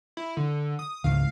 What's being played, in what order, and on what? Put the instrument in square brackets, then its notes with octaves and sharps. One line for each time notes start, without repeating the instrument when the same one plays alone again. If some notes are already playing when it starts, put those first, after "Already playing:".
[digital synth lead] E4
D3
D#6
[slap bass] C#2 G#2 E3 [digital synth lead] F5